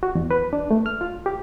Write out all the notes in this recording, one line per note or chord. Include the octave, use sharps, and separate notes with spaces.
F#4
E2
B4
D4
A3
F6
F4
G4